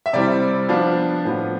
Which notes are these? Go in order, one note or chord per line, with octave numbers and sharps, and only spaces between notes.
E5
C3 G3 C4 E4 D5
F3 B3 D4 F5
A2 F3 B3